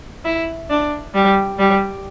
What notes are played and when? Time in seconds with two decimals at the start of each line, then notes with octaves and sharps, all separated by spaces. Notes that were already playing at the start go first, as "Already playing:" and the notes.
0.25 E4
0.70 D4
1.14 G3
1.59 G3